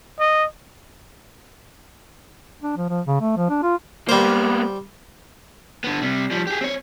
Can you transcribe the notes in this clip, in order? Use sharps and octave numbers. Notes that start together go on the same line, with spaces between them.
D#5
D4
F3
F3
C#3
A3
F3
D4
F4
G3 A#3 B3 C5
D3 B3
C3 G3
F3 G3
G4 G#4
C4 C#5